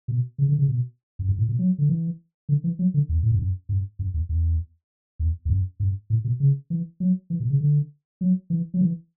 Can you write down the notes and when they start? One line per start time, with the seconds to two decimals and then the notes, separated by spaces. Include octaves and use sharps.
0.08 B2
0.38 C#3
0.48 D3
0.59 C#3
0.68 B2
1.19 F#2
1.29 G2
1.38 A2
1.49 B2
1.59 F#3
1.78 D3
1.89 E3
2.49 D3
2.64 E3
2.79 F#3
2.94 D3
3.09 E2
3.23 A2
3.31 G2
3.39 F#2
3.69 G2
3.99 F#2
4.14 E2
4.29 E2
5.19 E2
5.45 E2
5.50 F#2
5.80 G2
6.10 A2
6.24 B2
6.40 C#3
6.70 E3
7.00 F#3
7.30 E3
7.40 B2
7.50 C#3
7.61 D3
8.21 F#3
8.50 E3
8.74 F#3
8.81 E3